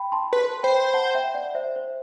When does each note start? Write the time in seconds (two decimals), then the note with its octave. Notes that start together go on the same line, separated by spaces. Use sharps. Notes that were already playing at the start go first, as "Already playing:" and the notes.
Already playing: G5 B5
0.12 A5 C6
0.32 B4 A5 C6
0.63 C5 G5 B5
0.94 F#5 A5
1.15 E5 G5
1.35 D5 F#5
1.55 C5 E5
1.76 C5